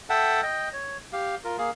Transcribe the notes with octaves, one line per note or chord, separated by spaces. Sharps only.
A4 E5 F#5 G5 A5
D#5 G5
C#5
G4 F5
F4 A#4
A#3 G#4 F5